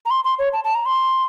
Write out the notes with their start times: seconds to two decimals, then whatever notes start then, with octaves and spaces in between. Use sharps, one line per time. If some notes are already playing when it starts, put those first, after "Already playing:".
0.06 A#5
0.10 C6
0.25 C6
0.39 C#5
0.53 A5
0.64 A5
0.75 A#5
0.86 C6